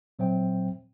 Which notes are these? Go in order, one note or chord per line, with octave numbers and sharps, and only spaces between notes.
A#2 F#3 C4 C5 E5 G5